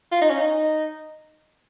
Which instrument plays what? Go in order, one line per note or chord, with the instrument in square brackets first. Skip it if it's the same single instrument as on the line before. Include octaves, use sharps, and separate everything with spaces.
[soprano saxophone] F4
D#4
C#4
D#4